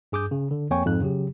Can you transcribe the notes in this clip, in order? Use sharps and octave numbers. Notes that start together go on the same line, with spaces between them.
G2 G#4 D6 D#6 G6
C#3
D3
F2 A#3 C#5 G5 G#5 C#6
F2 G#2 F#6
C#3 F#3 G4